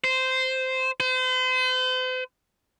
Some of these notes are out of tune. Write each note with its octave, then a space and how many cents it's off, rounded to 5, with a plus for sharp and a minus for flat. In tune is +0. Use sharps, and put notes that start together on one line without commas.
C5 -10
C5 -40